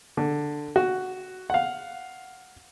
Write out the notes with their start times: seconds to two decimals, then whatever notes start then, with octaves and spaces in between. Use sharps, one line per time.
0.17 D3
0.76 F#4
1.50 F5 F#5